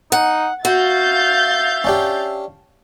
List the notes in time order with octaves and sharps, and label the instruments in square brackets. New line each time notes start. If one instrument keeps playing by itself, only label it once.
[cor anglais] D#4 [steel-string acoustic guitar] F#5
[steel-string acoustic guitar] F#4 [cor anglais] E5 [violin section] F5 G6 A6
[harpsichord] C#4 D4 G4